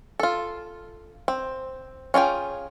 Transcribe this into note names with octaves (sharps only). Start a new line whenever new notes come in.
F4 A4
C4
C#4 F4 G#4 G5